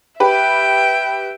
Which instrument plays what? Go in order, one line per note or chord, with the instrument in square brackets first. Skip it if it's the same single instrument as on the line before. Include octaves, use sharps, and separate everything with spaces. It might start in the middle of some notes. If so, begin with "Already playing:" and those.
[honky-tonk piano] G4 B4 [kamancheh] E5 G5